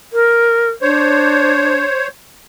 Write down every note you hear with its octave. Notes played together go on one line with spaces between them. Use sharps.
A#4
D4 C5 C#5